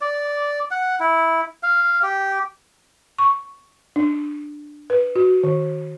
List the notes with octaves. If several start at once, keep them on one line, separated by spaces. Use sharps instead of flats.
D5
F#5
E4
F5
G4
C#6
D4
B4
F#4
D#3